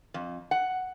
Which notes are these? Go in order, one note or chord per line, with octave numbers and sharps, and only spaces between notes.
F2
F#5